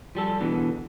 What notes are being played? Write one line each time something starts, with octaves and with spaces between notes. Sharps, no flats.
F3 G3 A4
B2 D3 E3